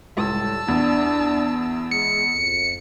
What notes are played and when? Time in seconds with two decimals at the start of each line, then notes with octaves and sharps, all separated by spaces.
0.17 C#2 A2 G3 A5 E6
0.68 E2 D4
1.91 G#3 C#7
2.31 F2